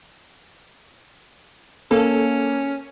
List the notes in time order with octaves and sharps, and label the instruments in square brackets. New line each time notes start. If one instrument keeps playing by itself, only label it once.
[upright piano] A#3 [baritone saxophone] C#4 [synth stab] A4